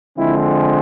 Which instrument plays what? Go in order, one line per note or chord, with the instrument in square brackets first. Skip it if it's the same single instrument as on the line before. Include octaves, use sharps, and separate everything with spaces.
[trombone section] D3 F3 G#3 C4 E4